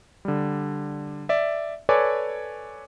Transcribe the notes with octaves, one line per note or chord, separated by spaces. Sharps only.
D3 G3
D5 E5
A4 B4 C#5 D5 G#5 D6